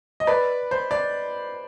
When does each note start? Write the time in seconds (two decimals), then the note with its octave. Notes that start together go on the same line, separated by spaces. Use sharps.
0.20 D#5
0.27 B4 D5
0.71 C5
0.91 D5